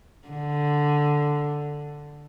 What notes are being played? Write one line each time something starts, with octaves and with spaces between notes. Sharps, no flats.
D3